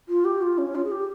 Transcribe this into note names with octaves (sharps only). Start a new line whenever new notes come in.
F4
G4
F4
C#4
F4
G#4
G4